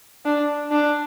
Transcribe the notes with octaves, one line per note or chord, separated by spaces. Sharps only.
D4
D4